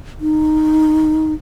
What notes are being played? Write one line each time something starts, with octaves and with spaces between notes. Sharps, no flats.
D#4